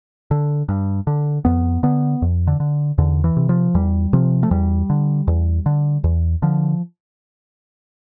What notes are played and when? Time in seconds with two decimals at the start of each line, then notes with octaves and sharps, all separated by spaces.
0.31 D3
0.69 G2
1.07 D3
1.45 F2 B3
1.83 D3 B3
2.22 F2
2.47 D3
2.60 D3
2.98 E2 D3
3.24 E3
3.37 C3
3.49 F3
3.75 E2 G3
4.13 C3 F3
4.43 A3
4.51 E2 G3
4.90 D3
5.28 E2
5.66 D3
6.04 E2
6.42 D3 F3